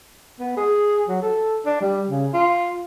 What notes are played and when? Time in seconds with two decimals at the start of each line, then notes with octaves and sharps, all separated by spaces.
0.39 B3
0.57 G#4
1.08 F#3
1.22 A4
1.66 D4
1.81 G3
2.10 C#3
2.34 F4